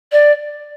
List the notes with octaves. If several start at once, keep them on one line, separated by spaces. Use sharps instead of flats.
D5